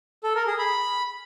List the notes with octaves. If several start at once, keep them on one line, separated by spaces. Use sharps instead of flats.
A4
A#4
G#4
B5